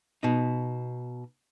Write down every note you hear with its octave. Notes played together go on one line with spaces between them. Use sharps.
B2 D#4